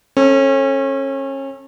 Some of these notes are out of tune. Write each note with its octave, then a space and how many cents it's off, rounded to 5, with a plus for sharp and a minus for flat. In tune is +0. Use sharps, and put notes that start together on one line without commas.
C#4 -30 A4 +0